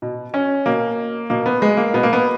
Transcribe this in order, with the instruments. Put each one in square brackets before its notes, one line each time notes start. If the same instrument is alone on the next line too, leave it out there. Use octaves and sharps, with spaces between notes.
[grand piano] B2
C#4
B2 A#3
B2 A#3
B3
G#3
A#3
B2 B3
A#3
B3